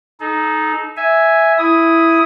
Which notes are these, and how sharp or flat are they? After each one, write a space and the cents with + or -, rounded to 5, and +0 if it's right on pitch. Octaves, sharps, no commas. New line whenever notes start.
D#4 +0 A4 -35
E5 +0 G#5 +0
E4 +0 D#6 +10